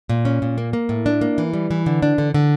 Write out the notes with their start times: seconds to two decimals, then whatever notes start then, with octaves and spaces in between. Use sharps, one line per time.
0.09 A#2
0.25 C#4
0.42 A#2
0.58 A#3
0.73 A#3
0.89 A2
1.06 D4
1.21 A#3
1.38 E3
1.53 G3
1.71 E3
1.86 D3
2.02 D4
2.18 D3
2.34 D3